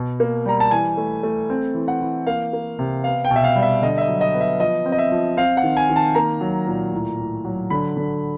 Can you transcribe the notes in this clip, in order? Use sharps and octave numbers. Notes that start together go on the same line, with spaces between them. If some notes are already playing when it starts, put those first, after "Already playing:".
Already playing: B2
A#3
G3 A#5
A5
E3 G#5
A3
A3
C4
E3
F#5
E3
A#3 F5
A#3
C3
B3 F5
G5
B2
E5
F5
G3
E5
D3 D#5
E5
D#5
F#3
D#5
B3
E5
F3 D#5
C4
D#5
E5
F3
C4 F5
F#5
D#3
G#5
D#3
A5
A#3 A#5
F#3
A#2
A2
A2
F#3
D3 B5
D3